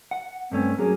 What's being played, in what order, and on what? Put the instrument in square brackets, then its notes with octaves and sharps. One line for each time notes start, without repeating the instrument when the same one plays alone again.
[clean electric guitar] F#5
[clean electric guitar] G2 A3 C#4 [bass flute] C4
[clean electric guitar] F#3 A#3 C#4 [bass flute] G#4